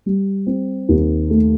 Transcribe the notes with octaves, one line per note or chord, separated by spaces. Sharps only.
G3
C4
D#2
A3